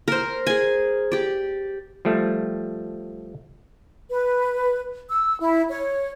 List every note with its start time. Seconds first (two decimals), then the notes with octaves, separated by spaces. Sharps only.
0.08 A#4 C5
0.47 G#4 G#5
1.12 G4 D5
2.05 F3 G3 A3
4.10 B4
5.09 E6
5.40 E4
5.70 C#5